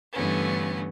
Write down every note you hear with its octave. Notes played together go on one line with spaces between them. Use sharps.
G2 D3 E3 A3 B3 C#4